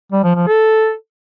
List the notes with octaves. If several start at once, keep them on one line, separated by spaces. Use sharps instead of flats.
G3
F3
F3
A4